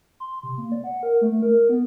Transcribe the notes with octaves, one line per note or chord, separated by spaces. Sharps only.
C6
C3
A#3
D5
F#5
A#4
A3
A#4
B3